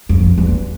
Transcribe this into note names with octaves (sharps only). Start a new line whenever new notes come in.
F2
E2